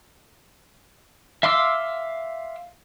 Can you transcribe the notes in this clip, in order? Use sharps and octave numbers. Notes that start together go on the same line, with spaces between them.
E5 F5 C6 D6 E6